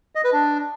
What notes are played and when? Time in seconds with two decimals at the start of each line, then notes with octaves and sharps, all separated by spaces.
0.15 D#5
0.24 B4
0.33 D4